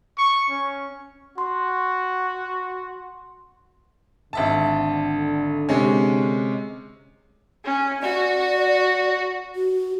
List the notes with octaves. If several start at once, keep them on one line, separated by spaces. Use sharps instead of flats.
C#6
C#4
F#4 C6
G#1 D3 E5 A5
C3 G#3 C#4
C#4
F#4 D5
F#4